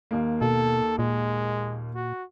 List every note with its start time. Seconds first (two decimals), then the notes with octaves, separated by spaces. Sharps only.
0.11 D#2 A#3
0.42 B2 A4
0.99 A#2 G#3
1.95 F#4